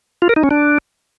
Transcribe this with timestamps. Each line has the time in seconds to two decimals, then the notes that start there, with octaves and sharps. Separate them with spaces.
0.22 F4
0.29 A#4
0.36 D#4
0.43 C#4
0.51 D4